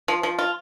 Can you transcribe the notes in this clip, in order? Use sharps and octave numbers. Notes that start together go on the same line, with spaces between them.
F3
F3
F4